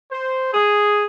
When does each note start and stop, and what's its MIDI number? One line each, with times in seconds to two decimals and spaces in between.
0.12 0.50 72
0.53 1.05 68